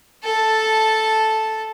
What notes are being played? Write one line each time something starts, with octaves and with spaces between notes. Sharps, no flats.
A4 A5